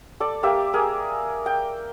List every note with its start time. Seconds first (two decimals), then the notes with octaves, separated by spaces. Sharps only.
0.20 A4 D5
0.43 A#3 G4 E5
0.73 G#4 A#4 G#5
1.46 G5